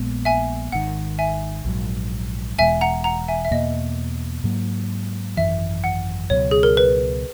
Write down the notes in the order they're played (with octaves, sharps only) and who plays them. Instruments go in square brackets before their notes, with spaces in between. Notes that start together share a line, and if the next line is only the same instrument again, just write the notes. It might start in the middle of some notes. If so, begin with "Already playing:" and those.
Already playing: [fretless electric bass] A#1 A#2 G#3 B3
[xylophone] E5 G#5
[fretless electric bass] G#1 G#2 D#3 [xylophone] F#5
[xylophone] E5 G#5
[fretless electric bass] A#1 G#2 F#3
[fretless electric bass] E1 E2 B2 G#3 [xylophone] E5 G#5
[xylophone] F#5 A#5
F#5 A#5
E5 G#5
E5
[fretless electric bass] E2 B2 A#3 [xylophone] D#5
[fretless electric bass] G#2 F#3 A#3
[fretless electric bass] G#1 F#2 E3 [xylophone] E5
[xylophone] F#5
[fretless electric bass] C#2 B2 F#3 [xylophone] C#5
[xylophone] G#4
A#4
B4